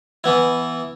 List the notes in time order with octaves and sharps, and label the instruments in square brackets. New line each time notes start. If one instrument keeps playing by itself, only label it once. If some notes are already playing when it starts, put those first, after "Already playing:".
[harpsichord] E3 B3 E4